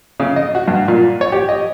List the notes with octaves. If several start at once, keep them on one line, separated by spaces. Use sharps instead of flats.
C#3
D#5
F#4
G2
A#2
C#5
G4
D#5